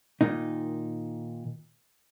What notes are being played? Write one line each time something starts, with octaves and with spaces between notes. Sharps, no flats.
A#2 D#3 D#4